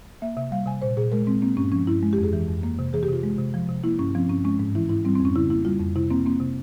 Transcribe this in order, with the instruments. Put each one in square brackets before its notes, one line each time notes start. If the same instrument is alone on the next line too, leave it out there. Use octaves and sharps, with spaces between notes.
[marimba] A#3 E5
C3 E5
G3 F5
C3 G#5
A#2 C5
A#2 G#4
G#3 A#4
G#3 C4
A#3 C4
G2 C#4
F3 C#4
G2 E4
G#3
G4
F2
G#4
E3
F2
A#3
C3
E3 G#4
G4
C3 F4
G#3
C3
F3
C3
A#3 E4
G2 C#4
F3 C4
G2 C#4
G#3 C#4
G#2
E3 E4
G#2 E4
G3 C4
C4
F2
C#4
C#3 E4
A#3 E4
G3 F4
F2
C3 E4
A#3 C4
A#3 C4
C3